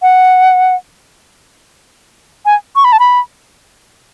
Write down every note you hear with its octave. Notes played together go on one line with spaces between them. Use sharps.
F#5
G#5
C#6
B5
A5
B5